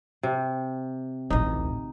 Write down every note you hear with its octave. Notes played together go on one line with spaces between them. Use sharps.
C3
A1 D2 D#4